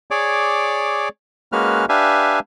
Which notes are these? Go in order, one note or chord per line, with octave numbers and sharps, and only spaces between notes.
G#4 C#5 D5 D6
G#3 A#3 C#4 F#4 B4 F6
D4 G4 B4 E5 F5 G#5